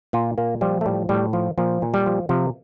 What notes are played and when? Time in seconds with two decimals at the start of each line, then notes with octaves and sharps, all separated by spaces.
0.13 A#2 F4
0.38 A#2 A#3
0.61 F3 G3
0.81 A3
0.86 A2 G3
1.09 A2 G3
1.33 F3
1.58 A#2 F3
1.82 A#2
1.94 G3
2.06 F3
2.29 C3 F3